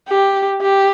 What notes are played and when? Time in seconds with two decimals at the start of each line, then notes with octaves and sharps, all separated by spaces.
0.09 G4
0.61 G4